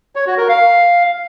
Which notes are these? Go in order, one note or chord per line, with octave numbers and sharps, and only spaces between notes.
C#5
F#4
A#4
F5